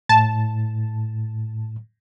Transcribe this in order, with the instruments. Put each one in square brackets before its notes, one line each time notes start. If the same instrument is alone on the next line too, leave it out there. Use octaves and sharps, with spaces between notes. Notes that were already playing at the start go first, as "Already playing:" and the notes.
[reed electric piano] A2 [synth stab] A5